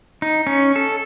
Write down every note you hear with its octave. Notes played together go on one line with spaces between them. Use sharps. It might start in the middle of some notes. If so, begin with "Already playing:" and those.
D#4
C#4
A4